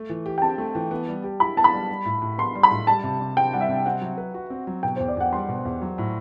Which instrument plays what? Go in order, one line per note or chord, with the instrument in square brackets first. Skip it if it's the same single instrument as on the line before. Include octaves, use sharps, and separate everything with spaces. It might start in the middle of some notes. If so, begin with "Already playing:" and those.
Already playing: [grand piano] A3
E3
G4
[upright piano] G5
[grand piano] C4 [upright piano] A5
[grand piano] A3
E3
B3
G3
G4
[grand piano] E4 [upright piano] B5
[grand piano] B3 [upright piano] A5
[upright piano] B5
[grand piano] G3
G3
A2
A2
[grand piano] B3 [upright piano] C6
[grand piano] G3
[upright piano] B5
[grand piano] A2
[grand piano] G3 [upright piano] A5
[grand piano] C3
C3
[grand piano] C4 [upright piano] G5
[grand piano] G3 [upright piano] F#5
[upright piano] E5
[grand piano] C3
[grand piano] C4 [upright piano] F#5
[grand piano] F#3
B4
F#4
C4
F#3
[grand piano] B2 [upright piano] G5
[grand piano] E2 [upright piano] C5
[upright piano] D5
[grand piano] E2 [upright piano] F#5
[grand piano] G3 [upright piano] C6
[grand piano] B2
E2
F#3
A2